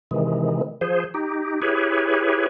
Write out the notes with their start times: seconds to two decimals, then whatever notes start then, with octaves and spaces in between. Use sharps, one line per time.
0.11 C3 D#3 E3 G#3
0.81 F3 G#4 C5
1.14 D#4 G4
1.62 E4 G4 G#4 B4 C#5